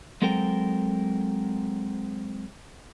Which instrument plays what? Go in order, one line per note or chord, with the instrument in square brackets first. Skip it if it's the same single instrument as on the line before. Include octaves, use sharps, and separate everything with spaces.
[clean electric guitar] F#3 G#3 C4 A4 A#4 G5